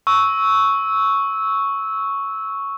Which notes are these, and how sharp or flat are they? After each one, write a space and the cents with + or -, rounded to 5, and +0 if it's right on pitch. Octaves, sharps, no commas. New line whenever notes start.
C#6 +0 E6 -10